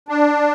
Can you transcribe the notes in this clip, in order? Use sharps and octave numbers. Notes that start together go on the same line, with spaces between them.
D4